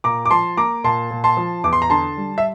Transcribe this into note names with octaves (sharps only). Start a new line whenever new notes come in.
A#2 A#5 D6
D6
F3 A5 C6
A#3 A#5 D6
A#2 A5 C6
A#2
A5 C6
F3
E2 D6
C6
A#5
D3 A5 C6
G3
E5